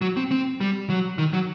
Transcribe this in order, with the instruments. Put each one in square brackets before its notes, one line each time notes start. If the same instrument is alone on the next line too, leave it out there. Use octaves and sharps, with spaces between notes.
[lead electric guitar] F#3
C4
C4
G3
F#3
D#3
F#3